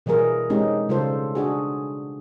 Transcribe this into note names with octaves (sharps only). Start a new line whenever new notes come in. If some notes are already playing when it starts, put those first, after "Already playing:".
B2 E3 G3 G#4 A#4
G#3 C4 C#4 D#4 G4 G#4
C#3 G3 F4 A4 C5
D4 F#4 G#4